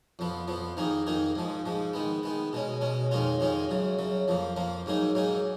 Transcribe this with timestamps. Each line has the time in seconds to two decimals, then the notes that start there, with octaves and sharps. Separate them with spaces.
0.19 F2 F3 B3
0.48 F2 F3 B3
0.77 F2 D#3 A#3 D#4 G#4
1.07 F2 D#3 A#3 D#4 G#4
1.36 G#2 F3 G#3
1.65 G#2 F3 G#3
1.93 D#3 G#3 B3
2.23 D#3 G#3 B3
2.53 B2 G#3 C#4
2.81 B2 G#3 C#4
3.11 F2 D#3 G#3 C#4 F4
3.40 F2 D#3 G#3 C#4 F4
3.70 F#2 C#3 F#3
3.99 F#2 C#3 F#3
4.28 F2 F3 A#3
4.56 F2 F3 A#3
4.86 G#2 F#3 A#3 D#4 G#4
5.15 G#2 F#3 A#3 D#4 G#4